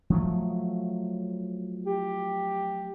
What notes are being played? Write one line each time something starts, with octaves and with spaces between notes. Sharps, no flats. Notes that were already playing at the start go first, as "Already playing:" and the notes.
F3 F#3 A3
G4